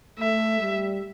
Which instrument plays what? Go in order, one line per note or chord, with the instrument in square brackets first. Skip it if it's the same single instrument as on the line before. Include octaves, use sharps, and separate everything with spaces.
[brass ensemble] A3 [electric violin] E5
[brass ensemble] G3